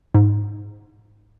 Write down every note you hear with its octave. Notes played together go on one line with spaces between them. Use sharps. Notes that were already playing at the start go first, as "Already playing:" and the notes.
G#2